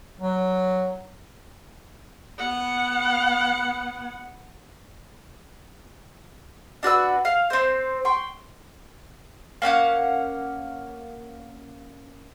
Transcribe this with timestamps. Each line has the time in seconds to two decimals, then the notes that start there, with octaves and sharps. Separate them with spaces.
0.20 F#3
2.38 B3 F#5
6.83 D4 F#4 B4 E6
7.25 F5
7.50 C4 C5
8.05 G5 C6 C#6
9.62 A#3 C#4 F5 F#5